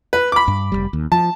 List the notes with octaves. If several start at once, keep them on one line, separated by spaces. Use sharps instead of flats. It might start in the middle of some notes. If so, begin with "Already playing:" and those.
B4
B5 D6
G2
F1 B1 G3
D#2
F3 A5